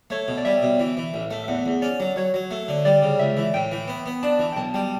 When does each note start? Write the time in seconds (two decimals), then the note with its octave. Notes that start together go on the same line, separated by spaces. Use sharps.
0.10 A3 C#5
0.28 B2
0.38 D5
0.45 G3 E5
0.62 B2
0.80 E3
0.97 E3
1.14 A1
1.31 A3
1.44 E5
1.48 E2 F#5
1.66 E2
1.82 C#4 D5
2.00 F#3
2.16 F#3 C#5
2.34 F#3
2.51 A3
2.68 D3
2.85 G3 D5
3.03 C#3
3.19 C#2 E5
3.37 E3
3.54 A2 G5
3.72 E3
3.88 B3
4.06 B3
4.23 D4 A5
4.39 E3
4.52 G5
4.56 B1 A5
4.74 G3 G5